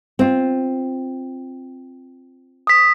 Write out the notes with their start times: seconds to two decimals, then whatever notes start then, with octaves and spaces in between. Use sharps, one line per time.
0.19 C4 F4
2.67 D#6 B6